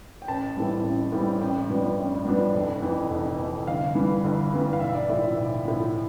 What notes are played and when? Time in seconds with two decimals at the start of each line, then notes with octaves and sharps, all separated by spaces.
0.22 G5
0.28 A1 A5
0.56 A2 E3 G3 C4
0.84 A1
1.12 A2 E3 G3 C4
1.41 A1 G5
1.69 G2 F3 B3 D4
1.98 A1
2.25 G2 F3 B3 D4
2.54 F1
2.82 F2 E3
3.10 F1
3.39 F2 E3
3.67 G1 F5
3.95 G2 E3
4.24 G1
4.52 G2 E3
4.73 F5
4.80 B1 E5
4.95 D5
5.09 A2 F3 E5
5.24 E5
5.38 B1
5.65 A2 F3